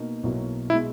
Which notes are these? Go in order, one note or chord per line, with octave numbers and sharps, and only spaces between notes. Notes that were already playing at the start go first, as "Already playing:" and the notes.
Already playing: B2 A#3 D#4
B1 B2 F#3 A#3 E4
B2 G#3 E4